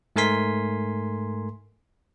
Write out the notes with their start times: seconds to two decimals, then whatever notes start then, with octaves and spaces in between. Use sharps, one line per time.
0.16 G#2 A3 A#4 G#5 C6 B6